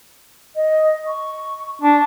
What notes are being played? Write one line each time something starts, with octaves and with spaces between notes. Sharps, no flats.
D#5
C#6
D4